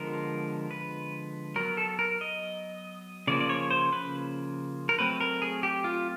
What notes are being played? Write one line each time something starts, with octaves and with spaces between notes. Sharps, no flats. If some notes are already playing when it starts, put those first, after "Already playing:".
Already playing: D3 F3 G#3 B3 A#4
B4
F#3 B3 A#4
A4
A#4
D#5
C#3 F3 A#3 C#4 D5
D5
C#5
C5
B4
A#4
F#3 A3 C4 B4
A#4
G#4
G4
F4